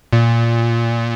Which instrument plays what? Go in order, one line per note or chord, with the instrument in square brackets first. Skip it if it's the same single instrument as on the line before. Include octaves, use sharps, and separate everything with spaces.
[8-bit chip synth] A#2